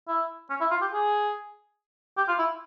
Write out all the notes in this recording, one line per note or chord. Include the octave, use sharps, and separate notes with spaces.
E4
C#4
E4
F4
G4
G#4
G4
F4
E4